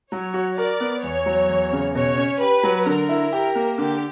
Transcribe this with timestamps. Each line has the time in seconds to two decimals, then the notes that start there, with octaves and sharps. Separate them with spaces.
0.12 F#3 C#5
0.34 F#4
0.58 A#4 D5
0.80 B3
1.03 E2 C#5
1.26 F#3
1.49 E2
1.72 C#3
1.95 B2 C#5
2.17 C#4
2.40 G4 B4
2.63 F#3
2.86 D3 A#4
3.09 E4
3.32 G4 A#4
3.55 A#3
3.78 D3 G4